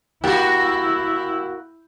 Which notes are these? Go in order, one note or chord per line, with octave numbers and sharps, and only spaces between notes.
A#3 E4 F#4 G4